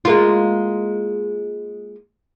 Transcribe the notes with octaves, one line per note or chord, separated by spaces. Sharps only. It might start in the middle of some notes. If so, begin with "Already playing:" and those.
G#3 A#3 F4